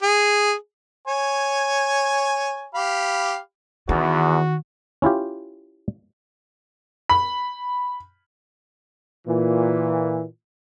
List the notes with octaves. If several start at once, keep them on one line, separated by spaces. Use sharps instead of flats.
G#4
C#5 G#5
G4 F5 B5
E2 D#3 F#4
C#4 E4 F4 G4
B5
A#2 E3